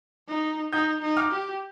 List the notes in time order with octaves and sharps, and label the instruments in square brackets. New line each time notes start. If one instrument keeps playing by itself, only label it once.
[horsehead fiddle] D#4
[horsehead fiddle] D#4 [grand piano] D#6 G6
[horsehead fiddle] D#4
[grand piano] D6 F6
[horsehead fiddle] G4